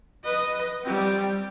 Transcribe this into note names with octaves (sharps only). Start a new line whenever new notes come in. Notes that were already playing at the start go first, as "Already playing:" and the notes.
B4 D#5
G3 C4